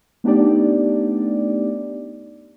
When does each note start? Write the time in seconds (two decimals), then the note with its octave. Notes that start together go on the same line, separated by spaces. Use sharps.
0.24 A3 B3 D4 D#4 G4 D5